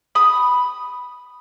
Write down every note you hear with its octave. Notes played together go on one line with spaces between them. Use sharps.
B5 D#6